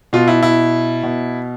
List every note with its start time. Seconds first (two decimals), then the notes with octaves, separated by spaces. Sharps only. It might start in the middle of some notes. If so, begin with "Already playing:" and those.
0.13 B2 F4
0.28 E4
0.43 E4
1.03 B2